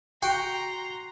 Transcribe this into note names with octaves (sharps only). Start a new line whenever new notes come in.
F#4 G5 A#5 C6